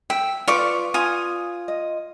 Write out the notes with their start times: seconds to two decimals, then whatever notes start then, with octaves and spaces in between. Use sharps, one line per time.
0.10 E5 G5
0.48 F4 B4 D5 C#6 D6
0.94 F4 G#5 D#6
1.68 D#5